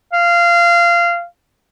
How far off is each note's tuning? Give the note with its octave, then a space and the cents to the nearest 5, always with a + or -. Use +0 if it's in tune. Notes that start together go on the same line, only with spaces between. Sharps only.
F5 -20